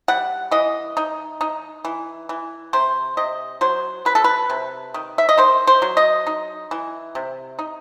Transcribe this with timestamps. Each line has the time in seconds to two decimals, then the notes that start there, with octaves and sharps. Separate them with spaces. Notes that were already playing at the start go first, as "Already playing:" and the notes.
0.08 G3 F#5
0.51 E3 D#5
0.97 D#4
1.41 D#4
1.85 E3
2.29 E3
2.73 C3 C5
3.17 C3 D#5
3.61 F#3 C5
4.05 F#3 B4
4.15 A4
4.24 B4
4.50 C3
4.94 D#3
5.18 E5
5.29 D#5
5.38 D#3 C5
5.67 C5
5.82 F#3
5.97 D#5
6.27 D#4
6.71 E3
7.15 C3
7.59 D#4